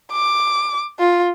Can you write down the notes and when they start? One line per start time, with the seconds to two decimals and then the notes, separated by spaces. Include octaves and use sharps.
0.12 D6
0.99 F4